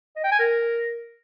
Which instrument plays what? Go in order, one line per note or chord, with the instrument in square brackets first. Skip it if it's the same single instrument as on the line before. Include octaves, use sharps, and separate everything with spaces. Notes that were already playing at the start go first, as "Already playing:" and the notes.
[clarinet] D#5
G5
G#5
A#4